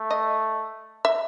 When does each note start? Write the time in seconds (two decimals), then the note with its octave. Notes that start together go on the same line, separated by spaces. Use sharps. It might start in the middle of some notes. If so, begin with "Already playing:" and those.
Already playing: A3
0.11 D#5
1.05 E5